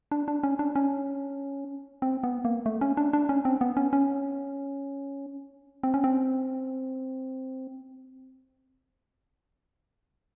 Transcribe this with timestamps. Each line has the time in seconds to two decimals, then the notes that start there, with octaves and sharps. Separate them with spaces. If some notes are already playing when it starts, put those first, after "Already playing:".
0.11 D4
0.28 D4
0.43 C#4
0.59 D4
0.76 C#4
2.02 C4
2.24 B3
2.45 A#3
2.66 A3
2.81 C#4
2.97 D4
3.13 D4
3.29 C#4
3.45 C4
3.61 B3
3.77 C#4
3.93 C#4
5.83 C4
5.94 C#4
6.04 C4